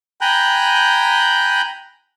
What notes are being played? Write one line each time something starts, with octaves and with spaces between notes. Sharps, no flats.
G5 G#5 A#5 B5 F#6 G6